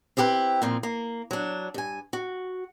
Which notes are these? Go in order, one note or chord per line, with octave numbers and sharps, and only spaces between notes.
C4 E4 G4 G#4 B4
A#2 F3 C4
A#3
F#3 D4
G2 G#5
F#4